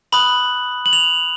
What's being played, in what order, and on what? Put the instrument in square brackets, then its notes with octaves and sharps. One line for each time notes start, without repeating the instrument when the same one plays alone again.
[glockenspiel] B5 D#6 F#6 F#7
F#7
F7